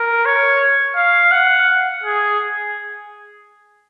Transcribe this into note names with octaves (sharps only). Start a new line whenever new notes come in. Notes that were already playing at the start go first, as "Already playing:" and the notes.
Already playing: A#4
C#5
F5
F#5
G#4